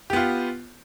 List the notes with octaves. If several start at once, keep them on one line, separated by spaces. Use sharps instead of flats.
B3 F4 G4